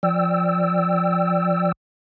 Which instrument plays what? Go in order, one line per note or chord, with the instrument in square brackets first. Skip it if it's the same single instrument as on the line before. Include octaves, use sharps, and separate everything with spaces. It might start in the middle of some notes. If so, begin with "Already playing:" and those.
[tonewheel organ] F3 D5 G5 E6